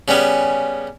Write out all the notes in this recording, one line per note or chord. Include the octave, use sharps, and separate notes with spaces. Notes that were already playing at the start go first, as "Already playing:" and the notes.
C#3 G3 B3 C#4